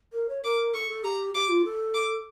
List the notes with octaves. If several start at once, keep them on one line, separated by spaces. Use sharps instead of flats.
A#4
C#5
A#4 D6
A4 C#6
A4
G4 A#5
G4 D6
F4
A4
D6